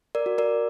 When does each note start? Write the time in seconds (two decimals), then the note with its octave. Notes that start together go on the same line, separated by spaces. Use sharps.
0.15 A#4 D5
0.26 F#4
0.38 A#4 D5